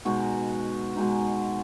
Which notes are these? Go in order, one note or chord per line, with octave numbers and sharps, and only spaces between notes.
B2 G#3 D#4 F#4
B2 G#3 D#4